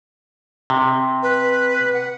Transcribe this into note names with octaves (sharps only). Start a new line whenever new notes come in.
C3
B4
F#5